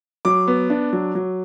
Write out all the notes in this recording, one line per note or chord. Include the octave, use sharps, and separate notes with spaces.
F#3 D6
B3
D4
F#3
F#3